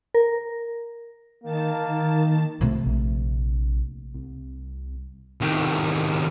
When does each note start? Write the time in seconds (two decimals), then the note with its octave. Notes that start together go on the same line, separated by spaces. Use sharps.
0.14 A#4
1.44 D#3 A#3 A5
2.61 C3 A3
2.86 A#1
4.14 C2
5.41 C2 D#3